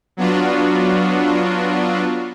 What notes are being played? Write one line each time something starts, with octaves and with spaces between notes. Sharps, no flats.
F#3 B3 D4 F4 F#4